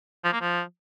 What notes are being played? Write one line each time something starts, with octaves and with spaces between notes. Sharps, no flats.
F3
A#3
F3